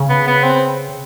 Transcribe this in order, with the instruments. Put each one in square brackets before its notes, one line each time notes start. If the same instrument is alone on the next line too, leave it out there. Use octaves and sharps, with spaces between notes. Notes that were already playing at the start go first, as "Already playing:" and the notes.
Already playing: [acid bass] C#3
[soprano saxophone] B3
B3
C4